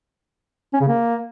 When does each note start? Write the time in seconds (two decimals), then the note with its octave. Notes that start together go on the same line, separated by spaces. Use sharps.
0.73 C#4
0.81 C#3
0.88 A#3